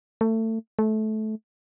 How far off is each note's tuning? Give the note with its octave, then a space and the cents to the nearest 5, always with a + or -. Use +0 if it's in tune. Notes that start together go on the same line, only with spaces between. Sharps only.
A3 +25
A3 -20